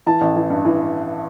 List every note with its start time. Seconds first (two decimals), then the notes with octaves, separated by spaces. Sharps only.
0.06 E3 A5
0.21 A1
0.36 E3
0.50 G2
0.65 E3